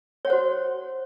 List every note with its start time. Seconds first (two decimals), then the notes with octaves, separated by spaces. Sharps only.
0.25 C#5
0.27 F#5
0.30 C5
0.33 F#4